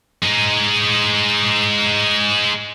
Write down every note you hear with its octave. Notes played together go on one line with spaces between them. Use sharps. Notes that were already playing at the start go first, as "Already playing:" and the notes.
G#3 D#4